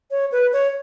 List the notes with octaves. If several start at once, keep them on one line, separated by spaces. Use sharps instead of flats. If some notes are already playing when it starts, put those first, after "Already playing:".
C#5
B4
C#5